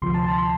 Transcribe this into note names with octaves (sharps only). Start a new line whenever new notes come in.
D2 C3 F3 C6
A5
A5
C6